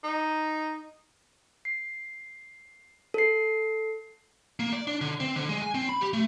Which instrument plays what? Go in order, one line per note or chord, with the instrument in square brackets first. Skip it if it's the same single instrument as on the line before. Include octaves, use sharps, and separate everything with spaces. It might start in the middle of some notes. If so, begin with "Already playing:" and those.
[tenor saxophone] D#4
[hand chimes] C7
A4 C7
[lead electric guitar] A#3
D5
D4
D3
C4
D3
G#3
G#5
C4
B5
G4
A3